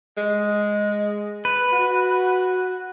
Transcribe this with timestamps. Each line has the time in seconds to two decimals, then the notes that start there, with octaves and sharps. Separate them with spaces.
0.17 G#3
1.45 B4
1.73 F#4